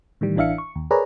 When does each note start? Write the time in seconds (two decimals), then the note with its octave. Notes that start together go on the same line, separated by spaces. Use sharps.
0.21 A2 D#3 E3 G3
0.36 A1 E3 D4 E5 F5 C#7
0.58 C#6
0.76 D#2
0.91 G#4 A#4 B4 C#5 D5 A#5